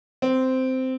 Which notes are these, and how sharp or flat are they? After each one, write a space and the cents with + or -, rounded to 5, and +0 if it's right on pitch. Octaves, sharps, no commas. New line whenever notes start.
C4 -10